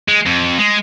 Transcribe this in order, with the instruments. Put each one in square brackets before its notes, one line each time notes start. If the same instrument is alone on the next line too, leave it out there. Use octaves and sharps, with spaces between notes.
[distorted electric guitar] G#3
F2
G#3